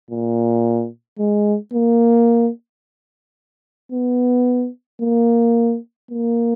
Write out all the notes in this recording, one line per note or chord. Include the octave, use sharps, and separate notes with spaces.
A#2
G#3
A#3
B3
A#3
A#3